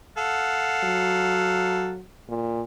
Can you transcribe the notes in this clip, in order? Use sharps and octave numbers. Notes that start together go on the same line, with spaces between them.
A4 F5 F#5
F#3
A#2